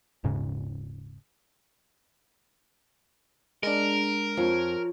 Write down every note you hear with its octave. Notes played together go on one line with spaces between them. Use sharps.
D#1 G#2 C#3
G#3 D4 A#4
F2 F3 C#5